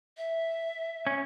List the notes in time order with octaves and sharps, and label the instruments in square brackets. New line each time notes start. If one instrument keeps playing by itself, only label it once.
[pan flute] E5
[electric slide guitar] C#4